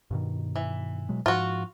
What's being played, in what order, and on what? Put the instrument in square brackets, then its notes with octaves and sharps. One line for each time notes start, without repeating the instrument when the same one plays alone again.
[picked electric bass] G2 B2 D#3
[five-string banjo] E3
[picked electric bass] B2 F#3 G#3
[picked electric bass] G#2 F3 [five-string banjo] F4 F#4